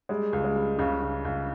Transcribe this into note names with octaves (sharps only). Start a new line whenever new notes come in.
G3 G#3
C#2
G#3
G3
C#2 C#3
C#2
C#2